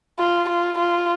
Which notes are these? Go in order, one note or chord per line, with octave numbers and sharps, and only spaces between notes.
F4
F4
F4